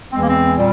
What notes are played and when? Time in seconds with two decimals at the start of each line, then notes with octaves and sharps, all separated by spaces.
0.11 E2 E3 G#3 C4
0.20 A#3
0.29 C4
0.57 A#2 G3